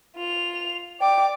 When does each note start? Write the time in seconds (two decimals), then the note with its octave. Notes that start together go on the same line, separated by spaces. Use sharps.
0.16 F4 F7
1.00 D5 G5 D6